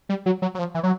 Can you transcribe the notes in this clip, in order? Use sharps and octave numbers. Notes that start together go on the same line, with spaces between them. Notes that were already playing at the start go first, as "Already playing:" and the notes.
G3
F#3
F#3
F#3
F3
E3
F#3